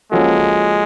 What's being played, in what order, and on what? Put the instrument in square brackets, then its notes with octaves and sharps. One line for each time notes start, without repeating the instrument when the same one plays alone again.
[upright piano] F3 A#3 C#4 F#4 A4 [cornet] G#3